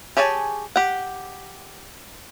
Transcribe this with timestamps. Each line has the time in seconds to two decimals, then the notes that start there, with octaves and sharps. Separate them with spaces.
0.17 G4 G#4 C#5 G#5 A5
0.76 G4 F#5